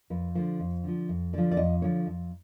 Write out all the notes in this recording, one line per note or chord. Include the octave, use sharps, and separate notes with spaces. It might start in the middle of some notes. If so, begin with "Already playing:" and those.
F2 B4
D3 F3 C5
F2
D3 F3
F2
D3 F3 D5
D5
F2 D#5
D3 F3 C#5
F2